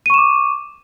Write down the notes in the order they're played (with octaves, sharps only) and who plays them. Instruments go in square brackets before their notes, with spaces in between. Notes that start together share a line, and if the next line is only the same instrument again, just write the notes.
[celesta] D#7
C#6
E7
D6